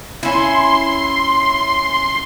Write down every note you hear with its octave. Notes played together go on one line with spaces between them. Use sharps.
C#4 E4 C6